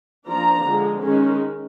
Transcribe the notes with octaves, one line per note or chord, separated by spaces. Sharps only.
F3 A#3 D4 A#5
D3 F3 G#3
D#3 G#3 C#4